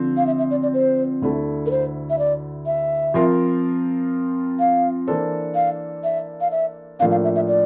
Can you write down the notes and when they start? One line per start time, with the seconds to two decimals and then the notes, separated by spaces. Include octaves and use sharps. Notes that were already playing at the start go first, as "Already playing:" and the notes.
Already playing: D3 F3 C4
0.17 F5
0.27 E5
0.38 E5
0.51 D5
0.63 D5
0.74 C5
1.22 D2 D3 A3 E4 A4
1.66 A#4
1.71 C5
2.10 E5
2.19 D5
2.66 E5
3.14 F3 C4 F4 A#4
4.60 F5
5.07 E3 A#3 D4 A4 C5
5.55 F5
6.04 E5
6.41 F5
6.51 E5
6.99 A2 F3 A#3 D4 F5
7.11 F5
7.24 E5
7.36 E5
7.48 D5